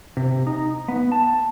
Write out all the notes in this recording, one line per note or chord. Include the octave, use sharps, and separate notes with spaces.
C3
D#4
B3
A5